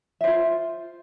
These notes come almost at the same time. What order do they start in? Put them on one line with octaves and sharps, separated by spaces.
E5 C5 F4